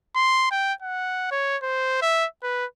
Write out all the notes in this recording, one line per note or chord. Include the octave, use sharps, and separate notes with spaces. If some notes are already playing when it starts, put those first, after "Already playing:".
C6
G5
F#5
C#5
C5
E5
B4